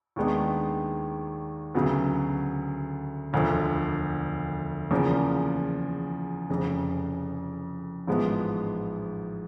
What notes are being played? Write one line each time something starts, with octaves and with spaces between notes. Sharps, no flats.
D#2 D#3 G#3 B3 D4
D2 C#3 F#3 B3
E1 D2 D3 F3
E2 C#3 F3 A#3
F1 F2 C#3
A1 G#2 F3 G#3 B3